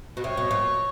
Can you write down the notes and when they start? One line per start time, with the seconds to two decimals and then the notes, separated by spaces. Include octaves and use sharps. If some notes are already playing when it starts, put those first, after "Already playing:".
0.17 B2
0.24 C3 C#5
0.37 B2
0.51 A#2